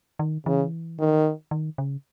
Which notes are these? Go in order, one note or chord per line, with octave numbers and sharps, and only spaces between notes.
D#3
C#3 E3
D#3
D#3
C#3